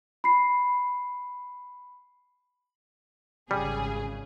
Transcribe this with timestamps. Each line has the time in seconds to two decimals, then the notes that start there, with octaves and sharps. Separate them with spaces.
0.24 B5 C7
3.51 G#1 C#3 G3 G#4